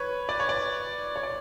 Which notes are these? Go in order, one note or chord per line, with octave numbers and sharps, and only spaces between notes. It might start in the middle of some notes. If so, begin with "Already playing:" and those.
Already playing: B4 C#5
D5
C#5
D5
C#5
D5